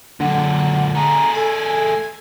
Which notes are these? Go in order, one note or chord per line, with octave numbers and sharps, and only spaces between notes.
F#2 A#2 D3 F#5
A3 G#4 A#5
A4 G#5